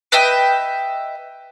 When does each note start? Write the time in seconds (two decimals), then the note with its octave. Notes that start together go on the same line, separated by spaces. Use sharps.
0.12 B4 D#5 E5 G5